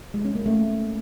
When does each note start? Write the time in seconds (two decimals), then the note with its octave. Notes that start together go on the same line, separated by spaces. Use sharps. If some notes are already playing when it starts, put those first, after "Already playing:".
0.14 G#3
0.25 C#4
0.35 A#3
0.46 A3